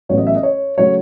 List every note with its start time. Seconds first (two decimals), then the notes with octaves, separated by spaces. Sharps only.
0.09 A1 A2 F#3 B3 C#5
0.18 D#5
0.27 E5
0.35 D#5
0.43 C#5
0.77 C#3 F#3 A3 C#5